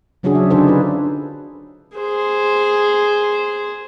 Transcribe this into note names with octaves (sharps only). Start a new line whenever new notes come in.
C#3 F#3 C#4 D4 F#4 G#4
E5
D3 D4 D#4 G#4 A4 C5
F4 B4
G#4 C5